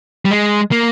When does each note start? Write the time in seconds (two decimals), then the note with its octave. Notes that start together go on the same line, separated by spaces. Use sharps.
0.25 G3
0.31 G#3
0.71 A#3